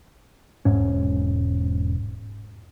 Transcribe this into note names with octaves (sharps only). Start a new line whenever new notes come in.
E1 G#2 C#4